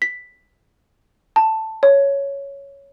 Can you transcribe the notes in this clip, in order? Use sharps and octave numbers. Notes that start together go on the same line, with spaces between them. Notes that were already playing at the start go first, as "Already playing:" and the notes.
B6
A5
C#5